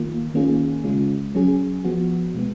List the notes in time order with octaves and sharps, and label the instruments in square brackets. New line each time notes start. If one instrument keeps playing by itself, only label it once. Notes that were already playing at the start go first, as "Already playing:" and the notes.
Already playing: [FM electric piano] D#3 A#3 F4
D#3 A#3 C#4 F4 G#4
C#3 G#3 C#4 F4
F#3 C#4 G#4
F3 B3 F#4
B2 G#3 B3